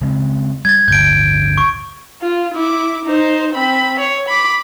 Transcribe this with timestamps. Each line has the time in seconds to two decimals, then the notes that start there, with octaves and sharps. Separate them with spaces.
0.01 C#3 G#3 C4
0.65 G3 G#6 A6
0.88 D1 G1 D3 G6 D7
1.58 C#6
2.22 F4
2.54 E4 D6
3.05 D#4 C5
3.53 C4 B5
3.99 C#5
4.28 B5 D6